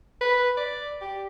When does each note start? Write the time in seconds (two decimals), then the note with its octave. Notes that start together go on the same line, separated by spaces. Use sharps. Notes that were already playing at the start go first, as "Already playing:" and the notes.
0.21 B4
0.57 D5
1.01 G4